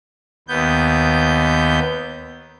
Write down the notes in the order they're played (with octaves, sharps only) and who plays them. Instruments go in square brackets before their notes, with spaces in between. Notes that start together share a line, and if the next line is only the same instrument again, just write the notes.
[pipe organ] D#2 B3 G6